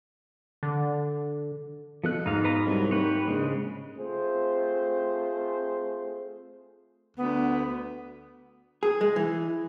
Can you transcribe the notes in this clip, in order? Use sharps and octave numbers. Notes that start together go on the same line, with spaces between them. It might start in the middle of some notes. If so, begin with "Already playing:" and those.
D3
B2 F3 A4 F#6
G#2 D#4 F5
B4 D#5 A#5
C2 F#3 G3
D#2 G4 B4 C#5
A#1 C#3 G#3
A3 C4 F4 G#4 C5
D2 B3
G#4
G#3
E3